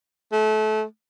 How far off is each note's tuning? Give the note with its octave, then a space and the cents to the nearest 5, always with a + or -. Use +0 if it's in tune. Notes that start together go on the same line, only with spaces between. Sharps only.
A3 -30